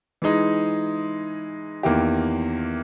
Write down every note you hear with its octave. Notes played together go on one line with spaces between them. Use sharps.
E3 G#3 D#4
E2 D#3 A#3 E4 G4